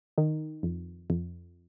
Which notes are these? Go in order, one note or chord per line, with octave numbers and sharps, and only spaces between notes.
D#3
F2
F2